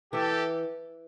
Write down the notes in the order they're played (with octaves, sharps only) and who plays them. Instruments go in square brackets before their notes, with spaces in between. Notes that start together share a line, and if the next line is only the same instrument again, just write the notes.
[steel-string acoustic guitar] E3 [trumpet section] G4 A4